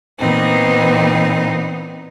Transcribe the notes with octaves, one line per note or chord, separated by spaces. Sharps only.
A#2 E3 B3 C4 D#4